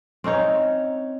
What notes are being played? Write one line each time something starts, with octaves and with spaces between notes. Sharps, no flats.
C4 C#4 D#4 C#5